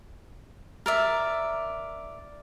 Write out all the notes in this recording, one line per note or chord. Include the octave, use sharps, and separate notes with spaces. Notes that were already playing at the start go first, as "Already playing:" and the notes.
A#4 D5 E5